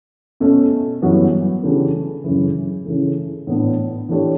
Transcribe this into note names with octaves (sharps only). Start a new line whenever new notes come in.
B2 A3 C#4
F#2 E3 G3 B3 F#4
C#3 E3 A3 D4 G4
F#2 C#3 E3
C#3 E3 A3
A2 E3 B3 D4
E3 A3 D4 G4 C#5